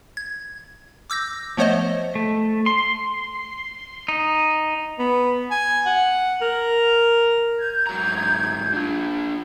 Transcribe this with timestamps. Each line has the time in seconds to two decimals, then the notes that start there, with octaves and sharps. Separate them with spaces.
0.17 G#6
1.10 D6 E6 G6 A#6
1.57 F3 A3 B3 C5 C#5 D#5
2.15 A3
2.66 C6
4.08 D#4
4.99 B3
5.51 G#5
5.86 F#5
6.42 A#4
7.58 G6 G#6
7.87 G#2 F#3 A#5
8.73 D4 F4